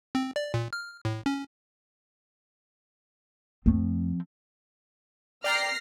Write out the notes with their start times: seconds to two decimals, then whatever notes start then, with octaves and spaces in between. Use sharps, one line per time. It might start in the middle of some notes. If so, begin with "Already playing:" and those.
0.15 C4
0.36 D5
0.54 A#2
0.73 F6
1.05 A2
1.26 C#4
3.66 F2 F3 A3 C4
5.44 D5 G5 A#5 F6 A#6 C7